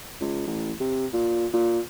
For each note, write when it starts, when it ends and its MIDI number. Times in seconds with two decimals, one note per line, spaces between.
0.21 0.43 37
0.47 0.72 33
0.80 1.06 48
1.13 1.46 46
1.53 1.79 46